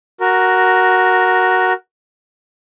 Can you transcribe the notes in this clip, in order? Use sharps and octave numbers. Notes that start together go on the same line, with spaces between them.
F#4 A#4